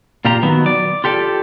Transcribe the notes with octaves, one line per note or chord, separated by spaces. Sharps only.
A#2 F4 G4 A#5
D#3 F#3 B3
D5
F4 G4 A4 D5